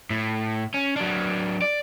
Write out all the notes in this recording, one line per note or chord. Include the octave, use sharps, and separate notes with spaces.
A2
C#4
F#3 D4
D5